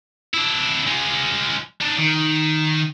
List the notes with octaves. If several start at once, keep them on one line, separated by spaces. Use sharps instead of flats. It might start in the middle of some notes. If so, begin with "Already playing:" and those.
D4 E4
G#3 F4
D4 D#4
D#3